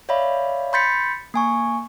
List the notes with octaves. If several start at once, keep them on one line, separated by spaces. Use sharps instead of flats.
C#5 D5 E5 F5 B5
B5 C6 G6 A6 B6 C#7
A#3 G#5 C#6